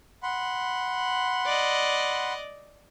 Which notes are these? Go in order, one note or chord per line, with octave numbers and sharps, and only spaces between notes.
F#5 B5 C6
D5 D#5